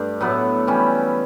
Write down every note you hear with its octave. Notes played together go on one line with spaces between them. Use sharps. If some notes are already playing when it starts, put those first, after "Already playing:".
Already playing: G2 A3 D4
A2 F#3 B3 E4
E3 G3 C#4